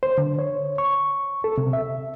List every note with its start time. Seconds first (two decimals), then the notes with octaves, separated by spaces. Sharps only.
0.03 C5
0.18 D3
0.39 C#5
0.78 C#6
1.44 A4
1.58 C3
1.73 E5